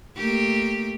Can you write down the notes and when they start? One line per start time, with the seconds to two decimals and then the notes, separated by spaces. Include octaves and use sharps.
0.16 A3 A#3 G4